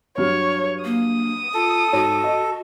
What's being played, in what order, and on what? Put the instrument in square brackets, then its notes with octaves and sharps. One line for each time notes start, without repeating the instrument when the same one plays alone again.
[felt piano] G2 F#3 F6 [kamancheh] C#5
[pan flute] A#3 [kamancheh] D#6
[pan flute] F4 [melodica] A4
[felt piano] G#2 C#5 [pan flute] F#4
[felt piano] D#5